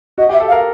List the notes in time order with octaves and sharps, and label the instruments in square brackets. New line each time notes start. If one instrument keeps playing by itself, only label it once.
[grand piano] F#4 [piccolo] D#5
[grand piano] G4
[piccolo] E5
[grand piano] A4
[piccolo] F5
[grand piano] A#4